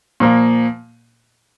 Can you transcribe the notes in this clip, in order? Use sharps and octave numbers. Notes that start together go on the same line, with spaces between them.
A#2 F3 A#3